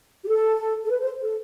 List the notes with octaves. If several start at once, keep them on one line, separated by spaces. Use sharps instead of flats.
G4
A4
A4
B4
C5
A4